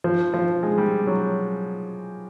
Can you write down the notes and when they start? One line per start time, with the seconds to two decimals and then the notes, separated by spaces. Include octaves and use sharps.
0.04 F3
0.34 F3
0.63 G#3
0.78 G3
1.07 F#3